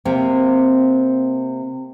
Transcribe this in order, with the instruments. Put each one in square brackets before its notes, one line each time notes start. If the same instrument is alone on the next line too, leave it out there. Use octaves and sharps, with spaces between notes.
[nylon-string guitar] C3 A#3 C4